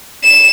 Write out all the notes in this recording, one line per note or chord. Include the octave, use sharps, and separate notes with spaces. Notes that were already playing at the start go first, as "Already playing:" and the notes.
E7